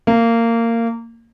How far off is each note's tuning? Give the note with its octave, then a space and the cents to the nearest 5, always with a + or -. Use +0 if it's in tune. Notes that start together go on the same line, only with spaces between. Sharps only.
A#3 -20